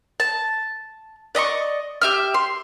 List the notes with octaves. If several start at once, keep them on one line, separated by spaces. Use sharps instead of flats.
A5
D5 D#5 A#5 C#6
G4 E5 F6
C6